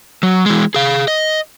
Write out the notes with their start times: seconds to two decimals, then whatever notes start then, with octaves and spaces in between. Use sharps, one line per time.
0.23 F#3
0.46 E3 G#3
0.74 G#4 F5
1.08 D#5